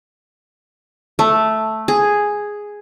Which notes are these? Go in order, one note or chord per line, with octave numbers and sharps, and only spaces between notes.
A3
G#4